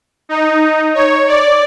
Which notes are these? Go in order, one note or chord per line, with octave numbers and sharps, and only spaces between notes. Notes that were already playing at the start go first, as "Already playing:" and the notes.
D#4
C#5
D5